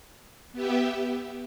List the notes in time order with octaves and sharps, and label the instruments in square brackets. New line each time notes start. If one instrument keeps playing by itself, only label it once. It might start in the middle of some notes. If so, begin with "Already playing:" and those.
[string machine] B3 G4 E5